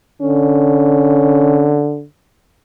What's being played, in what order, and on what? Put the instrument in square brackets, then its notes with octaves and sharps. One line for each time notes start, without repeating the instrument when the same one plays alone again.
[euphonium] D3 [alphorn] C#4